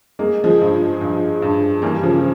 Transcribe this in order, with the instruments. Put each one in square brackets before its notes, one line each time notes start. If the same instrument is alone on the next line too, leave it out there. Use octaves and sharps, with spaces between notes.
[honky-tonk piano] G#3 [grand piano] A#3
[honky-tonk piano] F3 G#3
[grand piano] G2
G2
G2
[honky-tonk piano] E3 G3 [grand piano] A#3
[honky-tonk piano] C#3 F3